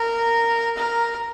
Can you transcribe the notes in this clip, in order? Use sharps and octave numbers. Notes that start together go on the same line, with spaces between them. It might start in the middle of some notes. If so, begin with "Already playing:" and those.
Already playing: A#4
A#4